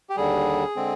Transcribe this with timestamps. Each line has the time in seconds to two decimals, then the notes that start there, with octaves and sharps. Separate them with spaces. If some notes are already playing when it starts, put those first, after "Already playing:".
0.10 G4
0.16 D#2 D3 G3 G#4
0.76 D3 G#3 C4